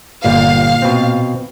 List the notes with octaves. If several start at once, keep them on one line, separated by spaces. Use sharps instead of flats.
G1 A#2 G3 F5
B2 C4